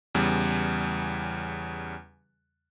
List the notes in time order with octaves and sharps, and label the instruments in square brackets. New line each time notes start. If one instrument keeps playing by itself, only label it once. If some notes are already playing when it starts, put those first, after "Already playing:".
[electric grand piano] E2 C#3 G3